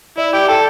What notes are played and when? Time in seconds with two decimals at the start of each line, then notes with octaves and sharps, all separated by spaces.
0.18 E4 D5
0.33 G4
0.48 A4 G5